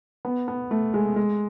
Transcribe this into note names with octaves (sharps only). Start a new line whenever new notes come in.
B3
B3
A3
G#3
G#3